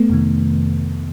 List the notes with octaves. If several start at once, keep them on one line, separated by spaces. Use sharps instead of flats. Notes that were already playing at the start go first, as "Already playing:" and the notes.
Already playing: A3 B3
F2 C3 D#3